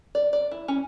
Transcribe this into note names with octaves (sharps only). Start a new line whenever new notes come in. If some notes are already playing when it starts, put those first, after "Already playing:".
D5
D5
E4
C#4